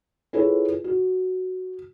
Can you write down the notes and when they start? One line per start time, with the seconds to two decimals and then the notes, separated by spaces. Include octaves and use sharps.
0.33 E4 F4 G#4 A4 B4 C#5
0.84 F#4